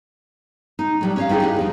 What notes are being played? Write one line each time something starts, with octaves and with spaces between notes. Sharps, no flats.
D#4
A2 F#3 G3
C#4 C#5 F5
G3 D#4 E4 F#4 G#4
G4 D#5 E5 F#5
E2 C#3 F3